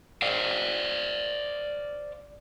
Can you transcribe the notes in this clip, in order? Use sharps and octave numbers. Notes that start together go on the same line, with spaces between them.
C5 D5 F5